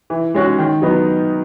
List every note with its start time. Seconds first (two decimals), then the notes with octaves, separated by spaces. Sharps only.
0.10 E3
0.35 G#3 C#4 F#4
0.59 D#3
0.82 F#3 B3 D#4